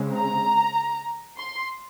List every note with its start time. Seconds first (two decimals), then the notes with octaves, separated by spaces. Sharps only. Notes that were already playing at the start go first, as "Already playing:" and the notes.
Already playing: C#3 G#3 C4
0.15 A#5
1.37 C6